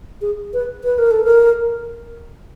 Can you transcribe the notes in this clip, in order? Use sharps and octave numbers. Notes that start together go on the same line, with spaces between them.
G#4
B4
B4
A#4
A4
A#4